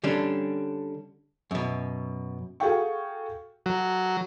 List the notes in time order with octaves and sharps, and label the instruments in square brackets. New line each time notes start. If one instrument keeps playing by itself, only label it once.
[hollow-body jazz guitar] D3 G3 C#4 D4
F#2 B2
[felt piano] F#4 G#4 A4 F5 G5 C#6
[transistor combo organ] F#3